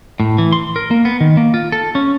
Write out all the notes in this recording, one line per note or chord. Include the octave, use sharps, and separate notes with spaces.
A2
E3
C6
A#4
A#3
B3
D#3
A#3
F4
A4
C#4